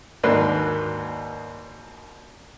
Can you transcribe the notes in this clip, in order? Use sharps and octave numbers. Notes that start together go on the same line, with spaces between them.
D#2 G#2 F#3 D4 A#4 B4